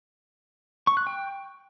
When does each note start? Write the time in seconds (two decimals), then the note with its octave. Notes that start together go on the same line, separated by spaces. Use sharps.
0.87 C#6
0.97 F#6
1.07 G5